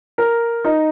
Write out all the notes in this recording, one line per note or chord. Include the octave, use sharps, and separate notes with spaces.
A#4
D#4